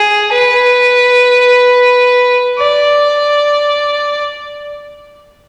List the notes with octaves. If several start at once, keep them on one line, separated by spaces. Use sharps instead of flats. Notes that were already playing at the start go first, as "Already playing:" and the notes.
Already playing: G#4
B4
D5